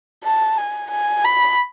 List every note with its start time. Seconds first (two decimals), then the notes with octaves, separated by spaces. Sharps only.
0.24 A5
0.58 G#5
0.91 G#5
1.24 B5